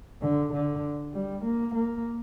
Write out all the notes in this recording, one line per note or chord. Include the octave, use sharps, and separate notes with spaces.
D3
D3
G3
A#3
A#3